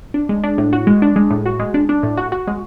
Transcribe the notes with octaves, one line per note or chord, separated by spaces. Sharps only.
D4
G#3
D4
A2
F#4
G#3
D4
G#3
A2
F#4
G#3
D4
D4
A2
F#4
F#4
G#3